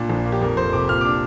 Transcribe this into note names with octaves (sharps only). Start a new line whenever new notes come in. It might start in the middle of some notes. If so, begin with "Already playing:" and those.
Already playing: A#2 D4
A#1
A#3
G4
F2 A#4
F1 C5
C3 D6
A#2 F6
D6
D4